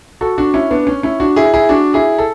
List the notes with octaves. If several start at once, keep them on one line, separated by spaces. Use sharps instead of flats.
F#4 A4
D4 F#4
C#4 E4
B3 D4
C#4
C#4 E4
D4 F#4
E4 G#4
E4 G#4
D4 F#4
E4 G#4
A4